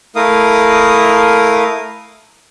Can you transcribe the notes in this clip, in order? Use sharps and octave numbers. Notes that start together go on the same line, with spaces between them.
A3 E4 A#4 F5 D#6